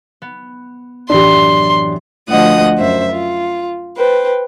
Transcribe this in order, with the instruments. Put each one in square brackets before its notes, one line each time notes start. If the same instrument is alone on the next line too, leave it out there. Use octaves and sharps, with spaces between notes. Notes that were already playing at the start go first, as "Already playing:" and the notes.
[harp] B3
[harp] F#2 A2 E3 [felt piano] D4 G4 [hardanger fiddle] C6
[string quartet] D2 F3 D#5 F#5 D#6
F#2 C5 E5
F4
B4 C5 G5